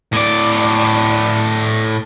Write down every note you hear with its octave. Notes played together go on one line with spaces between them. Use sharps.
A2 D5